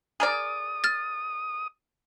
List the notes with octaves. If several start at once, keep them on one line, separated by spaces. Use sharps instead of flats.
G#4 A#4 D5 D#6
F6 A6